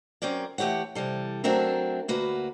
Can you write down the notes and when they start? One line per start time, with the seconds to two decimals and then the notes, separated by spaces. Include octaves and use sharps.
0.22 F#3 C4 C#4 A#4 D5
0.58 E3 A3 G4 C#5 F#5
0.95 C3 E3 G3 A4
1.44 F#3 A3 C4 D4 A#4 E5
2.08 D2 A#3 F#4 B4